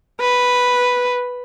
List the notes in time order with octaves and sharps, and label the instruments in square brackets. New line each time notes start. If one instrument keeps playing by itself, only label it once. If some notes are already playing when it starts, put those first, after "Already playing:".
[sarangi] B4